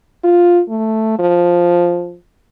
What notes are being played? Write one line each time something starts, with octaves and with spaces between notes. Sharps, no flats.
F4
A3
F3